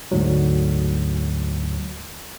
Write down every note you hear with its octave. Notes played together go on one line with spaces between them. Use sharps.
D2 G#2 F#3